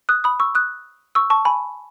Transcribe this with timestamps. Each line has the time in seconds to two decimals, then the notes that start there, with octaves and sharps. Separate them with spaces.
0.09 D#6 F#6
0.24 B5 D#6
0.40 C#6 E6
0.55 D#6 F#6
1.15 C#6 E6
1.30 A5 C#6
1.45 G#5 B5